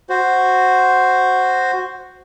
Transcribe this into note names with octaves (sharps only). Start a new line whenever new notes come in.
F#4 C5